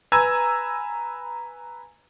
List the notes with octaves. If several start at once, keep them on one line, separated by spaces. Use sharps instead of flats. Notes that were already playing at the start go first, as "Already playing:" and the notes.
B4 G#5 A#5 B5 E6 G#6